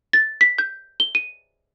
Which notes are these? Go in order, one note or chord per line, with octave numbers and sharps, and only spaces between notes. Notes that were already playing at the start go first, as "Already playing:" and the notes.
A6
B6
G6
G7
D#7